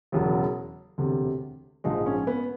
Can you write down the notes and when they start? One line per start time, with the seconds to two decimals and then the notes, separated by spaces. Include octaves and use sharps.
0.12 E1 E2 C#3 F#3
0.98 E1 D2 C3
1.84 A#1 G#2 F3 G#3 D#4
2.06 C#4
2.27 B3